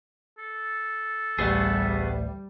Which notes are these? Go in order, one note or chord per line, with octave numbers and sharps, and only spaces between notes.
A4
A1 D2 G3 A3 B3 G#4